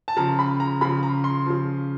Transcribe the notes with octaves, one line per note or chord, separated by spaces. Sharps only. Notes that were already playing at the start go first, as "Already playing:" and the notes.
A5
C#3 F3 A#5
B5
A#5
C#3 F3 B5
A#5
C6
C#3 F3